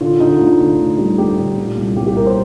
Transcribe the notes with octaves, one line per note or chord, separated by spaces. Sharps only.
D3 F4
D3 D#4
F4
D2
D2
D3
G3
D2 G4
D3
A#2
C2
C2 G4
G4
C2 A#4
C5